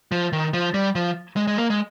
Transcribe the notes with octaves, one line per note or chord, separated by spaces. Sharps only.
F3
D#3
F3
G3
F3
G#3
G#3
A#3
G#3